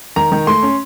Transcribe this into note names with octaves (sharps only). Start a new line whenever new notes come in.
D#3 A#5
D#3
A3 C6
C#4